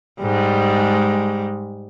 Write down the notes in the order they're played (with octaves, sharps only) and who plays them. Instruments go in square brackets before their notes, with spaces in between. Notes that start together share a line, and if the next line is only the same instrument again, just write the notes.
[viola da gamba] G#2 G3 G#3